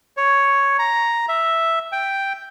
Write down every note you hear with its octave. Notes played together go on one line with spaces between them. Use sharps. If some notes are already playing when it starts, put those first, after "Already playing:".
C#5
A#5
E5
G5